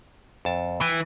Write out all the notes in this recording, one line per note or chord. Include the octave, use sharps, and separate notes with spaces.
F2 A5
E3 G5